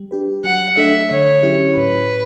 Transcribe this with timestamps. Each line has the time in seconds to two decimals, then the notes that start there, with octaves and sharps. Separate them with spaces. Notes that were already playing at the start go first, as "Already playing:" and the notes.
Already playing: G3
0.11 D4 G4 B4
0.44 F#3 F#5
0.77 A3 D4 A4 E5
1.10 D3 C#5
1.43 F#3 C#4 E4 G4
1.76 A2 B4